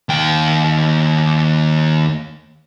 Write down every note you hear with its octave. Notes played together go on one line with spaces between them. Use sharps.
D#2 G5